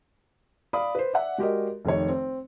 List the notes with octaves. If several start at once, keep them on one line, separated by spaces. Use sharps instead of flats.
D5 F5 B5 D#6
B4 C5
D5 E5 F#5
G#3 F#4 G4 A#4 D5 D#5
F1 D#3 C#5
C4